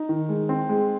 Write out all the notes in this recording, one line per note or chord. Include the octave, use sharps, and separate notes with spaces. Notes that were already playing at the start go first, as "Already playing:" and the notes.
Already playing: D#4
D#3
G#3
C4
G#3